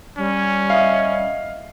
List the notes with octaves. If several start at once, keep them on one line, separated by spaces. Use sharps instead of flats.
G3 C#4
E4 D#5 F5